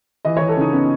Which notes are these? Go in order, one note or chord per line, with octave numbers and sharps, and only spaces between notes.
E3 D#5
E3 C#5
A4
C#3 D#4
B3 C#4